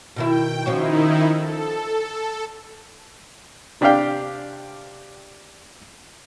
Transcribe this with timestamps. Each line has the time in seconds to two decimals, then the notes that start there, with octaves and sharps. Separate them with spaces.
0.16 B2 D#3 E4 G5
0.66 D#3 F3 C#4 D#4 E4 F#4
1.36 A4
3.81 C3 D4 G4 D5 F5 G5